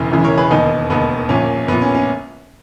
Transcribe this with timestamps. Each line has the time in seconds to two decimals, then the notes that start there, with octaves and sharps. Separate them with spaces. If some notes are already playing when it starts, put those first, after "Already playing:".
Already playing: E1 E2 C#3 E3
0.12 E1 E2 C#3 E3
0.24 A#4 C#5
0.37 G#4 B4
0.51 E1 D#2 D#3 B3 D#4
0.90 E1 D#2 D#3 B3
1.29 A#1 A#2 C#4
1.68 A#1 A#2 B3
1.82 C#4
1.95 C#4